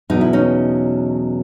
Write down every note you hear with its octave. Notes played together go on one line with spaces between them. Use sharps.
E2 B2 F#3 D#4
E4
C#4 D#4